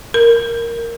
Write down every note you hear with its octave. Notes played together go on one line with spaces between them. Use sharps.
A#4